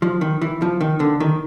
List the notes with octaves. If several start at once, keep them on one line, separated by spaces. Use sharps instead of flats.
F3
D#3
E3
F3
D#3
D3
D#3